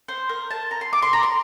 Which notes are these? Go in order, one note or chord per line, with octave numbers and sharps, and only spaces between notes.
C5
A#4
A5
A#5
C6
D6
C6
A#5
C6